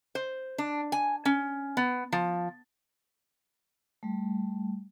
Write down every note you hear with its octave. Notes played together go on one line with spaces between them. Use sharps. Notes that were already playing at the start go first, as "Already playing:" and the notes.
C5
D4
G#5
C#4
B3
F3
G3 A3